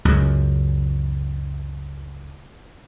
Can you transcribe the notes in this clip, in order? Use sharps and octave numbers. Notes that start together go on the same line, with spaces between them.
C#2 F#2